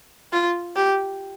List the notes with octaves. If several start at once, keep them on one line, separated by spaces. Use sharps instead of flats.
F4
G4